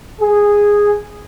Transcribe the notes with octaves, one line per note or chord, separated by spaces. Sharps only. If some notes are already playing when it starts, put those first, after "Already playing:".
G#4